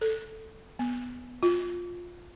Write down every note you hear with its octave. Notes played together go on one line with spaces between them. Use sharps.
A4
B3
F4